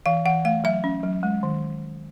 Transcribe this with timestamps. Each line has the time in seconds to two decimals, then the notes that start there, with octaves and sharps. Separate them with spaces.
0.06 E3 F5
0.25 E3 F#5
0.45 A3 F5
0.64 F#3 E5
0.84 C#4
1.03 F#3
1.23 G#3
1.43 D#3